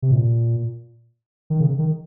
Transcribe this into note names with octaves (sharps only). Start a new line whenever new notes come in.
C3
A#2
D#3
C#3
D#3